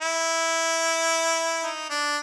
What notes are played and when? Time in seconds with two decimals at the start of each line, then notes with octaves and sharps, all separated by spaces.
0.02 E4
1.63 D#4
1.90 D4